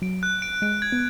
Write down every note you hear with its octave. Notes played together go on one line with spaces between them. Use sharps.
F#3 D7
F#6
D7
G#3 D7
G#6
B3